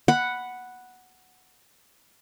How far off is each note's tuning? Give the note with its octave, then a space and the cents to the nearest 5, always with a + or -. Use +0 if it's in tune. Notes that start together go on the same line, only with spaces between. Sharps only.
F#5 +0 B5 +0